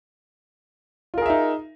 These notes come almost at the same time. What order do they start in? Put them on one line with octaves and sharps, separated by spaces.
F4 A#4 G#4 E5 D#4